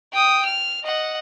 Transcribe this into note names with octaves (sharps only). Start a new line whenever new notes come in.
G5 D#6
F6
D#5 F#5